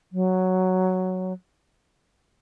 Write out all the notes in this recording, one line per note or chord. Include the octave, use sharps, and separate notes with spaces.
F#3